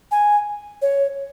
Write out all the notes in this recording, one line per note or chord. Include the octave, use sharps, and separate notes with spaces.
G#5
C#5